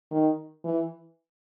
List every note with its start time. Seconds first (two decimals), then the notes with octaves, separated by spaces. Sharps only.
0.11 D#3
0.64 E3